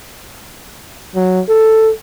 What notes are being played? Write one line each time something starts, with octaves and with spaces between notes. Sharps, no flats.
F#3
A4